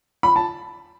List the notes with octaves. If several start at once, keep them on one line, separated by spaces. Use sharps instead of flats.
B5
A5